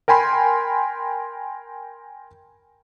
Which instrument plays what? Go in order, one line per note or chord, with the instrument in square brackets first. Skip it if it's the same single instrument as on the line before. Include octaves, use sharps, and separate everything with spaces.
[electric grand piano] A#4 G5 G#5 B5 C6